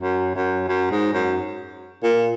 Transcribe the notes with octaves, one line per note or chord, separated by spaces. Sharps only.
F#2
F#2
F#2
G#2
F#2
A#2